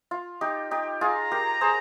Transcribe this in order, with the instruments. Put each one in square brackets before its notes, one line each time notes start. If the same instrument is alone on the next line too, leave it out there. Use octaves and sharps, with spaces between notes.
[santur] F4
D#4 G4
D#4 G4
[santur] F4 G#4 [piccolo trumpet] A#5
[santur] G4 A#4
G#4 C5